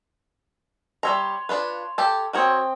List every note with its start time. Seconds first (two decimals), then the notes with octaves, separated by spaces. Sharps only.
1.03 G3 C#5 E5 A#5 C6
1.49 D4 F4 B4
1.98 G4 A4
2.33 C4 F#4 A#4 C#5 D#5 G5